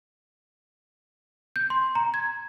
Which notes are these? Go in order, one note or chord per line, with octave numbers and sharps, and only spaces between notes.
G6
C6
A#5
G#6